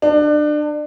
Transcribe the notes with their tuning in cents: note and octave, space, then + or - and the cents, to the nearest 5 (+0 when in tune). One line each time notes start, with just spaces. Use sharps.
D4 +30